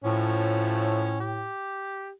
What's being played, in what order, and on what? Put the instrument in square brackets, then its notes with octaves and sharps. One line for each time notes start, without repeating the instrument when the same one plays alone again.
[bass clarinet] A2 [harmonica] F3 A3 C#4
[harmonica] G4